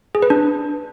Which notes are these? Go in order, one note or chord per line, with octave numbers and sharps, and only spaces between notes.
G#4
B4
D4